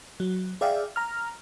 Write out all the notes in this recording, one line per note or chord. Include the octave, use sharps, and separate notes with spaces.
F#3
G#4 D5 E5 F5 G5
A#5 F6